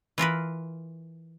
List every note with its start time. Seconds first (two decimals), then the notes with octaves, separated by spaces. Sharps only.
0.18 E3 F4 A#4 B4